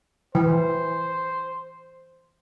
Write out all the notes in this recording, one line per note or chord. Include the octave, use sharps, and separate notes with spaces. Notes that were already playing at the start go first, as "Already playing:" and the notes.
E3 C5